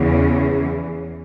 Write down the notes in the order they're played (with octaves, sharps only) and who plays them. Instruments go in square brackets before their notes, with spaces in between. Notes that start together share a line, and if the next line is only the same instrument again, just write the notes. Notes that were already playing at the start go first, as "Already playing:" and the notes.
Already playing: [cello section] E2 C#3 E3